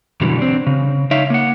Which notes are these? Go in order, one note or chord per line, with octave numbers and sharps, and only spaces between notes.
F#2 B2 D3 E3 G3
C4 D4
C#3
D#4 C#5 E5 F5
A#3 F#5